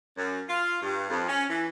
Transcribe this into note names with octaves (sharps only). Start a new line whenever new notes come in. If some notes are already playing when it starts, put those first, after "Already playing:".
F#2
F4
G2
F2
C#4
E3